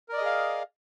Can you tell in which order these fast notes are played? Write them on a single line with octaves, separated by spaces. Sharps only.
A#4 D5 D#5 G#4 F5